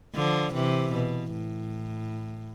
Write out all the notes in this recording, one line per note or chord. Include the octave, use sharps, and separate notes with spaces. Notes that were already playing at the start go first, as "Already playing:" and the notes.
D3 F3
C3 E3
B2
A2